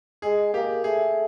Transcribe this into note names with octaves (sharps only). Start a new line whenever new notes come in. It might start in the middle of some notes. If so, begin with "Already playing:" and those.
G#3 G#4
A#3 G4
A3 G#4